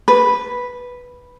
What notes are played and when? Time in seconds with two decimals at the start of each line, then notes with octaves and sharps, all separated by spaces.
0.08 B4